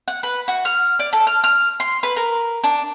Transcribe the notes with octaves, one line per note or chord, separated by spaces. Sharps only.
F#5
B4
F#4
F6
D5
A4
F6
F6
C6
B4
A#4
D4